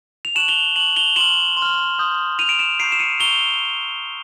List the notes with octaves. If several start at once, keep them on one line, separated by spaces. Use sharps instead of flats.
F7
A5 C#6 F#6 E7 F#7
F7 G7
A5 C#6 F#6 E7 F#7
F7 G7
C6 F6 E7 F#7
C6
F6
C6 D#6 G6
C6 D#6 G6 D#7 F7
D7 E7
D7 E7
A#5 C#6 E6 G6 C7 D7
E7
C#7 D#7
A#5 C#6 E6 G6 F7 G7